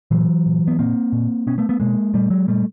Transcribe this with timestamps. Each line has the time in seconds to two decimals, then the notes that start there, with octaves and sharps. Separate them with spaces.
0.11 A#2 E3 F#3
0.46 A#2
0.68 B3
0.78 A#2 A#3 C4
1.12 A#2
1.47 B2 B3 C#4
1.58 A3 B3
1.69 A3 B3
1.80 B2 G#3 A#3
2.13 A#2 G3 A3
2.30 F#3 G#3
2.48 A#2 G3 A3